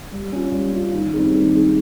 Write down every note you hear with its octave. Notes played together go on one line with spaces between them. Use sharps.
G3
C#4 F4
G3
C#4 F4
D#3
G3 C4 D#4 G#4
D#3
G3 C4 D#4 G#4